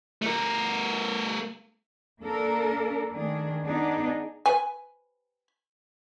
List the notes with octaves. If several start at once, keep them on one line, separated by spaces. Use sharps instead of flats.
A3 A#4
A#3 D4 A4 A#4
D#3 A3 D4 G#4
B3 D4 D#4 G#4
B4 G#5